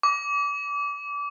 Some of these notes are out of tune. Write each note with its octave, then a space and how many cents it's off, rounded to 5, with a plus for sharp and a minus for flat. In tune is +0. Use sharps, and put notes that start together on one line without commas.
D6 -30